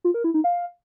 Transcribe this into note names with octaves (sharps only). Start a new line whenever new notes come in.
F4
A#4
E4
D#4
F5